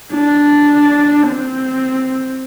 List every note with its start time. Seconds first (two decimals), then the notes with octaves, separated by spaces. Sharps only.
0.12 D4
1.28 C4